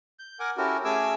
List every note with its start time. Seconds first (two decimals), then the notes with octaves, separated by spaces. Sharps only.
0.19 G6
0.40 A#4 F#5 G#5 D6
0.57 C#4 E4 F#4 G4 A4 A#4
0.85 A3 C#4 G#4 G#5 D6 E6